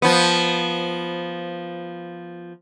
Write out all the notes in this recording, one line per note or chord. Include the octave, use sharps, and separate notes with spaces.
F3 B3